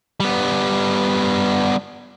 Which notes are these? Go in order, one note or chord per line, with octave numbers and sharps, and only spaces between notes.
G3 B3